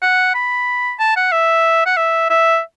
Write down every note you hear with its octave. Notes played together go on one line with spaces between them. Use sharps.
F#5
B5
A5
F#5
E5
F#5
E5
E5